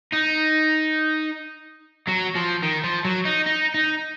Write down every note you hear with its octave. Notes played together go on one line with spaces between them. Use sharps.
D#4
F#3
F3
D#3
F3
F#3
D#4
D#4
D#4